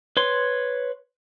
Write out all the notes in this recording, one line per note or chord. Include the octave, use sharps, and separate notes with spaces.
B4 C#5 C6